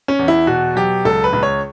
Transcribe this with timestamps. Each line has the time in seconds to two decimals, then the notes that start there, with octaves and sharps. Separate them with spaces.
0.08 C#4
0.19 E2
0.28 E4
0.47 B2 F#4
0.76 F#3 G4
1.05 C#2 A4
1.24 B4
1.33 C#2
1.43 C#5